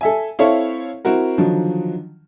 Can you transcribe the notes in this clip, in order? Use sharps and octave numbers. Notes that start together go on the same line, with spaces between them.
A4 E5 G#5
C4 E4 A4 C#5 E5 F5
C4 E4 F#4 A#4
D3 D#3 F3 F#3